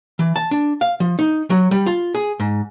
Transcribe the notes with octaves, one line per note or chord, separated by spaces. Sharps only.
E3
A5
D4
F5
F3
D#4
F#3
G3
F4
G#4
G#2